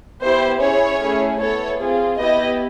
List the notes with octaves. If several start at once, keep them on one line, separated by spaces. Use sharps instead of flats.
B3 E4 G4 C5
C#4 E4 G#4 C#5
A3 C#4 E4 G#4
B3 E4 A4 C#5
C4 F4 G#4
B3 E4 G4 D#5